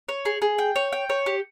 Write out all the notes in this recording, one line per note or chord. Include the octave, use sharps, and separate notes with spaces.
C#5
G#4
G#4
G5
C#5
G5
C#5
G4